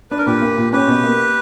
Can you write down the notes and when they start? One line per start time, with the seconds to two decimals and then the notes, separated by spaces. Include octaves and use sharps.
0.11 D4 B4
0.18 A#4
0.26 A#2 G4 B4
0.42 A#3
0.58 A#2
0.73 C#4 G4 B4
0.88 B2
1.04 A#3